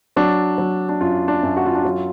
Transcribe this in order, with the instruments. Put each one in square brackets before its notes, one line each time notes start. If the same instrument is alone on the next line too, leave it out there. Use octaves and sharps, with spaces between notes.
[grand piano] F#3 D4
F#3
D4
F#2 F4
D4
F#2
F#4
F4
D4
F#3 F4